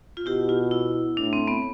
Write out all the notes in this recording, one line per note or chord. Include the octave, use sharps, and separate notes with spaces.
F4
B2 E4 G4
F4
E4
A2 D4
C4
B3